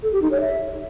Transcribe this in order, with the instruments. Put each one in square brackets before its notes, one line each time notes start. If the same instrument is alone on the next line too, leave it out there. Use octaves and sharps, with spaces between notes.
[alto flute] A4
G4
D#4
C#5
E5